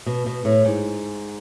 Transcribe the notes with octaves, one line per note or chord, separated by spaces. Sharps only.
B2
B2
A2
G#2